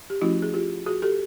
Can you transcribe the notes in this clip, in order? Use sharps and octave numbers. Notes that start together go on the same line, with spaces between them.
G4
F3 A3 C#4 E4 F#4
G#4
F4 G4
F#4 G#4
G4 A4